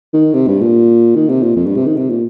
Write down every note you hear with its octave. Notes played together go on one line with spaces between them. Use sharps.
D#3
C3
G2
A#2
D#3
C3
A#2
F2
G2
C3
D#3
C3
A#2